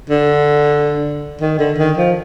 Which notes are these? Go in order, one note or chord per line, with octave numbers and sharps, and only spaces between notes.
D3
D#3
D3
D#3
F3